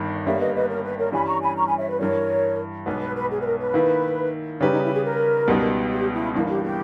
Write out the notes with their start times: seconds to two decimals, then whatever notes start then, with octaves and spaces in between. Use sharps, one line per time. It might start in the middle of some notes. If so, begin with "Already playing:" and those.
Already playing: G1 G2 D#3
0.26 G1 G2 G3 A#3 C#5 E5
0.40 B4 D#5
0.55 B4 D#5
0.69 A#4 C#5
0.83 B4
0.98 A#4 C#5
1.12 G2 E3 G3 C#4 G#5 B5
1.27 A#5 C#6
1.41 G#5 B5
1.57 A#5 C#6
1.66 G#5 B5
1.78 C#5 E5
1.88 B4
1.99 G2 E3 G3 A#4 C#5
2.86 B1 B2 G#3 B3 B4
3.01 B4
3.15 B4
3.30 G#4
3.39 B4
3.45 A#4
3.59 B4
3.74 D#3 A#3 E4
4.60 C#3 G3 C#4 D#4 G4 B4
4.71 D#4
4.83 E4
4.93 G#4
5.04 A#4
5.48 C#2 B2 G3 B3 D#4
5.91 G4
6.13 E4
6.35 G1 G2 E3 A#3 E4
6.49 G4
6.63 G4